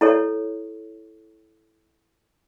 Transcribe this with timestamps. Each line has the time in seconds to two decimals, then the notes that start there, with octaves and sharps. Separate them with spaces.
0.01 E4 A4 C#5